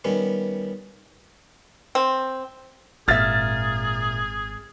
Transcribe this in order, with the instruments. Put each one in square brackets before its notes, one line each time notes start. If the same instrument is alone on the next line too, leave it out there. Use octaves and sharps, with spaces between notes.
[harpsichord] D#3 G3 B3 C#4
[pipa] C4
[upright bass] G#1 [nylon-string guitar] A#2 E5 [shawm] G#4 [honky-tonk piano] F6 A6